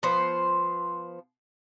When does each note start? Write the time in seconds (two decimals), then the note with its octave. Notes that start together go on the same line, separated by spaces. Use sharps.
0.03 F3 B3 C5